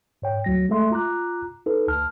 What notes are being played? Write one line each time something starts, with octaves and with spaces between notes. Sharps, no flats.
G#2 C#5 G5
D2 F#3 A#6
G#3 A3 A4 E5 C6
F4 A#5 D6 F#6
D#4 A4 B4
D2 A5 F6